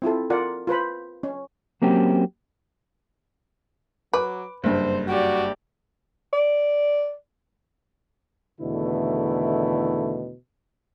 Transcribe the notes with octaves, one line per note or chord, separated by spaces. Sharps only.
C4 E4 F4 A4
F4 A#4 D5 F#5
F4 B4 C5 B5
C#4
F#3 A#3 C4 C#4 G4
F#3 B4 D6
F#1 G2 C5
F#4 G4 D5
D5
E2 B2 D3 D#3 A3 E4